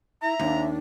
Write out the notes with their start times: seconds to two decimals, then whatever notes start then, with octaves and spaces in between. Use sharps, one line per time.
0.22 E4 E5 A#5
0.39 D#2 D4